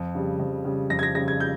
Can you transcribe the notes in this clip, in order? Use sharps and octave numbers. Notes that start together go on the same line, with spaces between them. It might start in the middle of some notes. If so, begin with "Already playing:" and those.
Already playing: F2
C#3 G3
F2
C#3 G3
F2 A#6
G#6
A#6
C#3 G3 A#6
G#6
G6